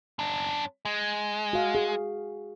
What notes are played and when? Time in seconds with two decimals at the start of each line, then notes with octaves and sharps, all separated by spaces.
0.19 F#2 D4
0.85 G#3
1.53 F#4 F5
1.75 G#4